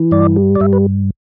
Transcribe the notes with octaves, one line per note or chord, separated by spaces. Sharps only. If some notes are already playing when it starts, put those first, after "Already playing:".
Already playing: E3
G2 D5
G3
D5
G2 E5
B4